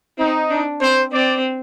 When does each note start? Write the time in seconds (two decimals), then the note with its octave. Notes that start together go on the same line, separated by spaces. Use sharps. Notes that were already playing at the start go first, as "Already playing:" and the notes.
0.18 C4 D#4
0.50 D4
0.81 C4 C5
1.12 C4 D5